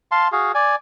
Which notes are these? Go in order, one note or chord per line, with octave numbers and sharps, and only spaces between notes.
F5 A5 C6
F#4 G#4 F5
D5 G#5